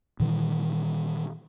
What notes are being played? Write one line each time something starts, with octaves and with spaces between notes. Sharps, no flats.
A#2 D#3 E3 G3